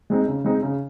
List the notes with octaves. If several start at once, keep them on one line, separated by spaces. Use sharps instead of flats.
G#3 C4 D#4
C#3
G#3 C4 D#4
C#3